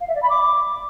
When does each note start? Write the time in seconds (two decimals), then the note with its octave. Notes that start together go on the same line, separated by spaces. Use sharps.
0.01 F5
0.08 E5
0.15 D5
0.23 B5
0.30 D6